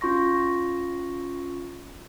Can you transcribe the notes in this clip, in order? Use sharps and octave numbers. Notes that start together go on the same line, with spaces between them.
C#4 F4 C6 C#6 A#6